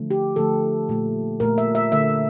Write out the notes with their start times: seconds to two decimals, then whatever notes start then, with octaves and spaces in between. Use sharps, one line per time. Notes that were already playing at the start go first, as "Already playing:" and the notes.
Already playing: D3 F3 A3
0.11 G4
0.36 D3 F3 A3 A4
0.89 A#2 A3
1.40 A#2 A3 A#4
1.58 E5
1.75 E5
1.92 D3 A3 E5